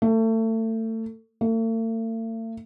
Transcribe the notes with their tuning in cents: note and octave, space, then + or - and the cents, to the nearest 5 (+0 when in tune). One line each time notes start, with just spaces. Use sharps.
A3 +30
A3 +45